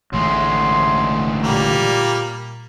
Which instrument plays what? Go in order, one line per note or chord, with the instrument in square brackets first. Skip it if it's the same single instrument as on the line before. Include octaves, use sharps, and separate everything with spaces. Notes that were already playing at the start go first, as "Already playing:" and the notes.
[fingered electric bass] A1 [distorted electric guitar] D2 G#3 [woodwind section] C#5 E5 C6
[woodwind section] A#2 [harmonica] G3 A#3